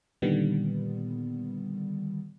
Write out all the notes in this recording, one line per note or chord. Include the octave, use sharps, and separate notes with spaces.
A#2 D3 D#3 G3 B3